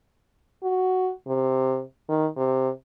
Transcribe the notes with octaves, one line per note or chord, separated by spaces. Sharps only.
F#4
C3
D#3
C3